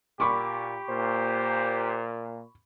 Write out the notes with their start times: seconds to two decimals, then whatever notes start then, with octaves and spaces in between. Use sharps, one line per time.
0.20 A#2 G4 B5 C#6 D6
0.89 A#2 C5